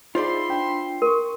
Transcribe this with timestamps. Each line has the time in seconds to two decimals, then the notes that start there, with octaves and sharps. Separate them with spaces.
0.15 D#4 F4 G#4 C5 D5 E5 B5 C6
0.49 D4 G5
1.02 A#4 C6 C#6